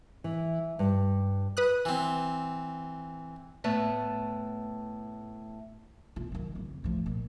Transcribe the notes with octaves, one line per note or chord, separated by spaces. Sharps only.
E3
G2
B4 D#6 F#6
E3 C4
A2 A3 B3 A5
E1 F4
D#3 F#3
F2 C#3
A2 F3
A#2